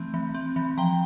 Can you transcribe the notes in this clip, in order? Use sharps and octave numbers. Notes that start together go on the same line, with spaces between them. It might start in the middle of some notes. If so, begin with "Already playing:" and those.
Already playing: E3 A3 C4
E3
C4
E3
F3 G5 A#5